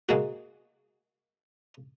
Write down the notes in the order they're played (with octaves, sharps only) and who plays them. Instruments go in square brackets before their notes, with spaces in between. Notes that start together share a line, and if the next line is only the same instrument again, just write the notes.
[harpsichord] G#3 A#3 F#4